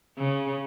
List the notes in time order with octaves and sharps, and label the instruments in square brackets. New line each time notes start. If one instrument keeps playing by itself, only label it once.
[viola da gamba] C#3